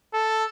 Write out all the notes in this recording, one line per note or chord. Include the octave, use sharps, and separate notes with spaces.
A4